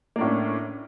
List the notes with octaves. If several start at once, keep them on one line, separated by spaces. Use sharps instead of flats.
A2 A#3 C#4 D4